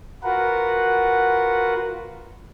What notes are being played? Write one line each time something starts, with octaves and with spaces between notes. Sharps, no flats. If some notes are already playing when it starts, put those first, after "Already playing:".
F4 F#4 A#4 B4 F#5